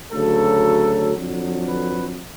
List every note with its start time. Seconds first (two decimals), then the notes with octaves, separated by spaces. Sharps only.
0.12 D2 C#3 F#3 A4
1.16 F2 D3 F#3
1.68 B4